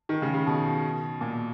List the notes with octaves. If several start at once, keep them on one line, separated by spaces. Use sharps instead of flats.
D#3
C#3
C#3
B2
A#2